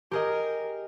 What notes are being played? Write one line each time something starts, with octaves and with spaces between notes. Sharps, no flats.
G4 G#4 A#4 D#5